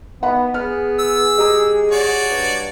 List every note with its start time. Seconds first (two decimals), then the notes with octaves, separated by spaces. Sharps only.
0.23 B3 D#4 F#5 B5
0.54 B3 G#4 F6
0.99 E6
1.38 G#3 G4 A#5 D#6
1.92 F#4 C#5 D5
2.32 G2